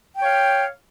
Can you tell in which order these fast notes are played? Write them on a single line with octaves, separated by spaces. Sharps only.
G5 C#5 F5